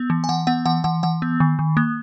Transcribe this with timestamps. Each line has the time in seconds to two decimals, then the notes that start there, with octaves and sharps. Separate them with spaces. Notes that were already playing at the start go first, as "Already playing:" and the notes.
Already playing: B3
0.10 E3
0.24 G#5
0.29 E3 F#5
0.47 B3 F#5
0.66 E3 F#5
0.84 E3 F#5
1.03 E3 F#5
1.22 B3
1.40 D#3
1.59 D#3
1.77 A#3